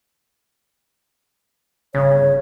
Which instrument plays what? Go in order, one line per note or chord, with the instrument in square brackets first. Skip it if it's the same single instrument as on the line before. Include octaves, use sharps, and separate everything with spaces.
[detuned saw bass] G1 [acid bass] C#3 [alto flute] C#5